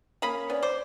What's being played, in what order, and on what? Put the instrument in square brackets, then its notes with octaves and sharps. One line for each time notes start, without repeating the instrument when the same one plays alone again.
[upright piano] A#3 C#4 F5 [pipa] D#5 B5
[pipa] B3 [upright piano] C#4 [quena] D5
[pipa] C5 [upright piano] D6